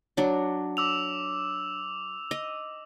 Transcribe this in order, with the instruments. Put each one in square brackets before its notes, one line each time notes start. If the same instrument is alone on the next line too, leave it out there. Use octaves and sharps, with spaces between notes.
[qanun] F#3 D4
[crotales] D6 E6 F7
[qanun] D#5